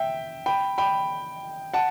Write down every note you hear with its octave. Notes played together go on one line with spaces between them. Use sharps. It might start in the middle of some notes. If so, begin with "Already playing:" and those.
Already playing: E5 G5
G5 B5
G5 B5
F#5 A5